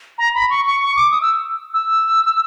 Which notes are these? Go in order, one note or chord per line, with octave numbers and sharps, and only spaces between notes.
A#5
B5
C#6
C#6
C#6
D6
D#6
E6
E6